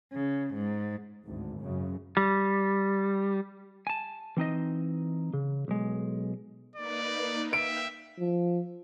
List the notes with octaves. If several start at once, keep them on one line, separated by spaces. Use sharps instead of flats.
C#3
G#2
G#1 D2 A2
F#2 C#3
G3
G#5 A5
E3 C4 D#4 D#5
C#3
B1 G#3
A#3 D#4 B4 D5
E5 F5 G5 D7
F3